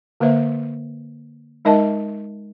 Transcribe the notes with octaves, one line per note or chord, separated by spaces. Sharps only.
D3 A#3 B4 C5 E5
G#3 D#4 A#4 D#5 E5 A5